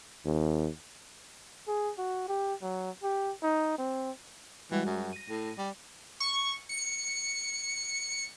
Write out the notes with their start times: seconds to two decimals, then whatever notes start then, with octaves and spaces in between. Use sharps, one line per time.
0.25 D#2
1.68 G#4
1.98 F#4
2.28 G4
2.62 F#3
3.03 G4
3.43 D#4
3.78 C4
4.71 E3 G3 G#3 F#4
4.86 F#2
5.12 A#6 D#7
5.29 A2
5.58 G3
6.20 C#6
6.69 C#7